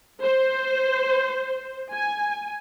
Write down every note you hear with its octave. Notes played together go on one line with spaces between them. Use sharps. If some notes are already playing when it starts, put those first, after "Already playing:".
C5
G#5